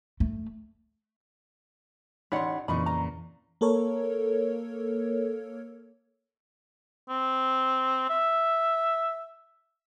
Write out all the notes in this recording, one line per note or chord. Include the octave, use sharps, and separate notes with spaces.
A3
A1 D#4 C#5 D5 F#5 B5 C6
F2 A#2 C#3 E3 D#4 B5 C#6
A#5
A#3 A4 A#4 C#5
C4
E5